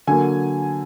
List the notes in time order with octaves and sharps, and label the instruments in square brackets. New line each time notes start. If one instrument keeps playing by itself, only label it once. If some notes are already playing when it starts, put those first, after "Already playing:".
[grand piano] D3 F#3 A#3 G#5